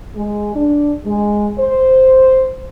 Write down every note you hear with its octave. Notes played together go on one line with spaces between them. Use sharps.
G#3
D4
G#3
C5